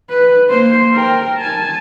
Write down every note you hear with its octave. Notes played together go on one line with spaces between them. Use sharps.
B4
A#3 C5
A#4 G5
G#5 A5